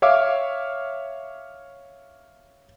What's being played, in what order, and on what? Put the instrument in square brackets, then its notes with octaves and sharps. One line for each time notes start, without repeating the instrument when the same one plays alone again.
[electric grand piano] C#5 E5 F5 D6